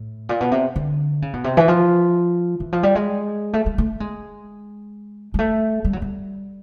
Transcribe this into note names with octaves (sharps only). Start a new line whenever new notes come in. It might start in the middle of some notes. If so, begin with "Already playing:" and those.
Already playing: A2
A#2
B2
C3
D3
C#3
B2
C3
E3
F3
E3
F3
G3
G#3
A3
G#3
A3
G#3
G#3
A3
G3
F#3
G3